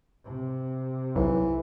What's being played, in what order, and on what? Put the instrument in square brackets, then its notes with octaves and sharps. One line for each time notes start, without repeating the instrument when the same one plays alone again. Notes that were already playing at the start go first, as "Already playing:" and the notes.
[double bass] C3
[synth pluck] B1 [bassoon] E3